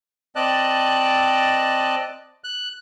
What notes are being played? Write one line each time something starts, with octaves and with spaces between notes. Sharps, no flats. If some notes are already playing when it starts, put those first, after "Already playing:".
C4 D5 D#5 A5 F#6
F#6